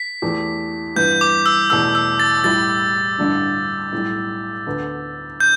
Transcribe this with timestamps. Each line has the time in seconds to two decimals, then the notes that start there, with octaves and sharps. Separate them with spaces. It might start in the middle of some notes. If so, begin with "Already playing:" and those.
Already playing: B6
0.22 E2 E3 A3 G4
0.96 G2 E3 B3 G6
1.21 D6
1.46 E6
1.70 E2 B2 A3 E6
1.95 E6
2.20 A6
2.44 A2 G3 E4 G4 A6
3.18 A1 G2 D3 G3 D4
3.93 B1 A2 G3
4.67 D2 D3 B3
5.40 G6